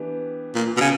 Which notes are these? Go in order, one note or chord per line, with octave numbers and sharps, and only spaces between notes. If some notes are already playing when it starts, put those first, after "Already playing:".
Already playing: E3 B3 D4 G4
A#2
B2
C#3